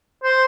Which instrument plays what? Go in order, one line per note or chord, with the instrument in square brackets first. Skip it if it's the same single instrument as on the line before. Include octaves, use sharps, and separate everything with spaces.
[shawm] C5